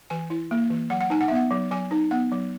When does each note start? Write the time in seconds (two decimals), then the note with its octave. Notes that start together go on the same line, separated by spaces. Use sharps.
0.10 E3 G#5
0.30 E4
0.51 A#3
0.70 E3
0.90 F#3 F#5
1.01 F#5
1.10 D#4 G#5
1.21 F#5
1.28 E5
1.31 B3 F#5
1.51 F#3
1.71 F#3 G#5
1.91 D#4
2.11 B3 F#5
2.31 F#3